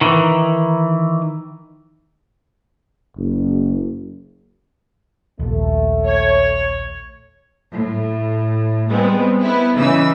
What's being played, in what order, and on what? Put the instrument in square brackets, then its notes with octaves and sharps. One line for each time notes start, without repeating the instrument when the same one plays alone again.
[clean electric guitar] D#3 E3
[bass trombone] F#1
[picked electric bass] A#1 D#2 [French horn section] A3
[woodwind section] C#5
[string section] A2
G3 G#3 B3 C4
B3 E4
C#3 E3 D#4 B4 E6